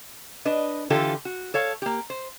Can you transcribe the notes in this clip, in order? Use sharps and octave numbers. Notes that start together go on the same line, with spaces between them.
D4 B4 D#5
D3 E3 F4 G4 A4
F#4
A4 C#5 F5
A#3 G4
C5